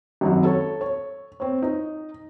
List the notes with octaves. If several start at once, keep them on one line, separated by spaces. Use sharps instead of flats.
G#1 F#2 F#3
A4 C#5
C#5
C4 C#5
D#4